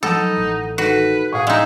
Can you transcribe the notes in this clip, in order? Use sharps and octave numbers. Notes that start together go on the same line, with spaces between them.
F3 F#3 D#4 A4 F#5 B5
A1
D#3 F#4 A4 B4
A2 G#4 F5 F#5 C#6
G#3 D#4 E5